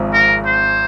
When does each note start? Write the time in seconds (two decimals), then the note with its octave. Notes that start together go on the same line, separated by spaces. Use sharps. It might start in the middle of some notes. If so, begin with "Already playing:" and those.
Already playing: G#1 G#2 F3 G#3 C4
0.13 A#4
0.46 C5